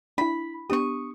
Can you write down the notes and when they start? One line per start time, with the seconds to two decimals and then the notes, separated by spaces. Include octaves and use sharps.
0.18 D4 E4 B5
0.70 B3 D4 G4 C#6 D#6